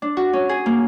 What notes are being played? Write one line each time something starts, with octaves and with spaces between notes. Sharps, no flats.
D4
F#4
C#4
G#4
A#3